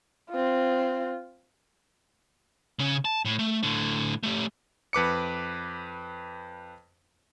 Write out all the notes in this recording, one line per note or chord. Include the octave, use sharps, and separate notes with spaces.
C4 F4
C#3 C#4
A5
A2
A3
A2 D3
A3 G4
F2 B4 D6 C#7